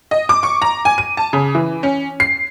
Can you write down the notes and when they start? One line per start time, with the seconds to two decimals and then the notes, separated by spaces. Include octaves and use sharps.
0.11 D#5
0.29 D6
0.43 C#6
0.62 A#5
0.85 G#5
0.98 D#7
1.17 A5
1.33 C#3
1.55 E3
1.83 C#4
2.20 C7